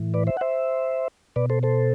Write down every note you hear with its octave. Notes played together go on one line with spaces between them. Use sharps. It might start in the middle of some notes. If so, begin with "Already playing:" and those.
Already playing: A2 E3
B4 D5
C5 E5
F#5
C5 E5
B2 B4 D5
A4 C5
A4 C5